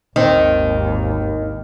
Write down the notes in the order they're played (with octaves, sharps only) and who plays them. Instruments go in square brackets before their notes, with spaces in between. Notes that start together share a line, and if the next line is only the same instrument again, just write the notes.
[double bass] G#1 D#2 [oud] D#3 [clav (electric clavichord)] C4 D#5